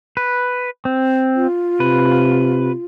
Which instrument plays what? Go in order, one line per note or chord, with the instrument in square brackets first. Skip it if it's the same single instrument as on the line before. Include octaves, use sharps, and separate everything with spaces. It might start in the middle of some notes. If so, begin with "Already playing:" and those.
[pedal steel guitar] B4
C4
[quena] F4
[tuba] C3 [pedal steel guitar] B4